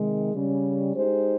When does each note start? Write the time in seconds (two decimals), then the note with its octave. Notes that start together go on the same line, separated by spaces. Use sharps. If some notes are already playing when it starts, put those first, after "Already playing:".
Already playing: C3 D#3 G#3
0.33 C#3 G3 C#4
0.94 G#3 D#4 G4 C5